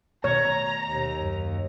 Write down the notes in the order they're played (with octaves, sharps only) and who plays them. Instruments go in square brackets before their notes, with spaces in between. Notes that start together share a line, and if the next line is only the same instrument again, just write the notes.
[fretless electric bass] B2 D#3 A3 [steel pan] C#5 [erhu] A#5
[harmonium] D#2
[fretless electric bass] F#2